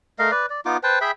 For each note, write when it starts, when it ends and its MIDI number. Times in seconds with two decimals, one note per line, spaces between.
0.19 0.31 57
0.19 0.31 70
0.19 0.31 75
0.19 0.31 77
0.31 0.46 71
0.31 0.46 74
0.50 0.61 74
0.65 0.77 59
0.65 0.77 63
0.65 0.77 65
0.65 0.77 86
0.83 0.99 71
0.83 0.99 72
0.83 0.99 79
0.83 0.99 81
1.01 1.11 68
1.01 1.11 76
1.01 1.11 79
1.01 1.11 83